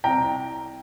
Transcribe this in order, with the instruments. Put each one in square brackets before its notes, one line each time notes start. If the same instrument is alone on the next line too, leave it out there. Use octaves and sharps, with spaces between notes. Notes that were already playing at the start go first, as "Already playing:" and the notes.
[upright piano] C2 G5 A#5